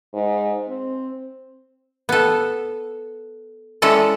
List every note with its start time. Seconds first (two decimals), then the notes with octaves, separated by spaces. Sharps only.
0.13 G#2
0.68 C4
2.09 B3 A4
3.82 G#3 C#4 E4 A4 D5